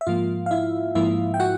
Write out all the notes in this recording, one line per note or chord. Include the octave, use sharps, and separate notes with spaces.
E5
G#2 F3 A#3 F4 F5
F5
E4 E5
G#2 F3 A#3 E4 E5
G5
F#4 F#5